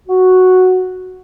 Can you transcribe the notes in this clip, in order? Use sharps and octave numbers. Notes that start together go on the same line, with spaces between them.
F#4